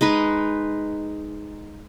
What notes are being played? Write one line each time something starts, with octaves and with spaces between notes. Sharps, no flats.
G#3 D#4 B4